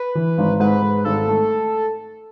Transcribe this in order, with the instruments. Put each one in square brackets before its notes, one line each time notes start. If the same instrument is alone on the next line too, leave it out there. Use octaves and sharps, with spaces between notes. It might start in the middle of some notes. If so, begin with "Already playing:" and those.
Already playing: [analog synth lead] B4
[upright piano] E3
G#1
[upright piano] G#2 [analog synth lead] B4
[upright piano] G#2
[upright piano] G#1 [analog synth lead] A4
[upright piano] A3